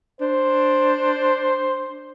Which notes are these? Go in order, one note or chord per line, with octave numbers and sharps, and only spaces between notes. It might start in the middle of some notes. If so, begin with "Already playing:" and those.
D4 C5